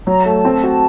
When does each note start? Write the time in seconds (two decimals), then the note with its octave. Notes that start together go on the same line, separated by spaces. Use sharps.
0.07 F#3 A#5
0.25 A3 A5
0.45 C4
0.63 F#4